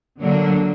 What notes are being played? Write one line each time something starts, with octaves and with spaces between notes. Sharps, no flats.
D3 F#3 A#3 D4